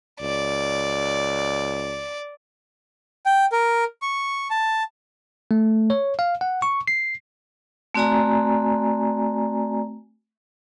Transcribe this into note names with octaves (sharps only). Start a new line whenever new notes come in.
C#2 D5
G5
A#4
C#6
A5
A3
C#5
F5
F#5
C#6
C7
A3 C4 F#4 D5 G#5 A#5